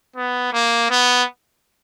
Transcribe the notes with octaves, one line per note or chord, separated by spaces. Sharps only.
B3
A#3
B3